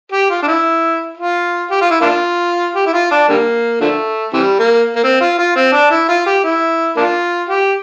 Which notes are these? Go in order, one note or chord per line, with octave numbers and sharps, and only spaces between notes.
G4
F4
D4
E4
F4
G4
F4
E4
A#3 D4 F4
G4
E4
F4
D4
D3 G3 A#3
D3 F3 A3
C3 E3 G3
A#3
A#3
C4
F4
F4
C4
D4
E4
F4
G4
E4
A#3 D4 F4
G4